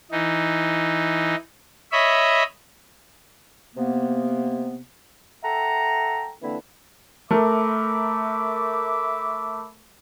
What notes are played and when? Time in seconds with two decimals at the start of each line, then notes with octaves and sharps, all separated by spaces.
0.11 E3 D#4
1.92 C#5 D#5 E5 B5
3.75 C3 A#3 B3
5.43 A4 E5 F#5 G5 A#5
6.41 D3 E3 A#3 C4 D4 E4
7.31 A3 A#4 E5 B5 D6